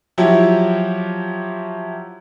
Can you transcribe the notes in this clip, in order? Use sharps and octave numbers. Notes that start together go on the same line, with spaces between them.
F3 F#3 E4 G4